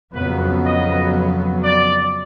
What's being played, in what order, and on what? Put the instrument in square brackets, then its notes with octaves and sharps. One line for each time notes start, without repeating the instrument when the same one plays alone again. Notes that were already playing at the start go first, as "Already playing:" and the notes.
[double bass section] F2 C#3 F#3 B3 [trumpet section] B4
[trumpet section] D#5
D5